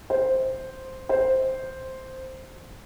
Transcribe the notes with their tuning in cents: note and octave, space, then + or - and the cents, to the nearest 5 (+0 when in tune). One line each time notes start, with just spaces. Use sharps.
C5 +0
C5 +0